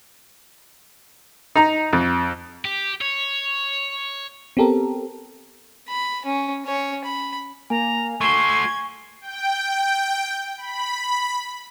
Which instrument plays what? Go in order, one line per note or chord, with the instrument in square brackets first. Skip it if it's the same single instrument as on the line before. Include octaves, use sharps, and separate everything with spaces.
[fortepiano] D#4 A#5
F2
[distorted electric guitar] G4
C#5
[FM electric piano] B3 C4 G4 A4 A#4
[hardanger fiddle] B5
C#4
C#4 C#5
B5
[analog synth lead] A#3 [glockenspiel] G#5 [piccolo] A#5
[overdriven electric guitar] A3 F#4 [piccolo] C6 [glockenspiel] C#6 G7 [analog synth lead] G#6
[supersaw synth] G5
B5